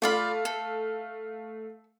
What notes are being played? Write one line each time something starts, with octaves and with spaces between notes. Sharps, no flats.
A3 F4 D5 F5 B5
A4